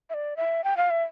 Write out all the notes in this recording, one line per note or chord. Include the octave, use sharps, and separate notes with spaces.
E5
D5
E5
G5
F5
E5